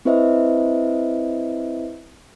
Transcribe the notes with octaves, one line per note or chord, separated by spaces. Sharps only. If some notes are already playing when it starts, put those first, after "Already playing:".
C4 E4 B4 C5 D#5 E5